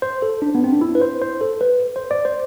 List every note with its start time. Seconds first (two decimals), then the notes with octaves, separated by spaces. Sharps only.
0.02 C5
0.22 A4
0.42 D4
0.55 B3
0.64 C4
0.72 D4
0.81 E4
0.95 B4
1.02 C5
1.22 C5
1.41 A4
1.61 B4
1.96 C5
2.11 D5
2.25 C5